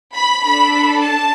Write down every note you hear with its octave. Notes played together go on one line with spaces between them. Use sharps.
B5
D4 A4 B5
A5